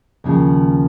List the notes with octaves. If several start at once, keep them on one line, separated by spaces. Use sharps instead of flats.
D#2 C#3 F3